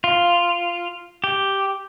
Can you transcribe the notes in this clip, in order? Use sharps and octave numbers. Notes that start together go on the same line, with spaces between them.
F4
G4